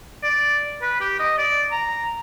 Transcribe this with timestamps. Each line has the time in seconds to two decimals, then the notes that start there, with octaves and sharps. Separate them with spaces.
0.23 D5
0.82 B4
1.01 G4
1.20 D#5
1.38 D5
1.72 A#5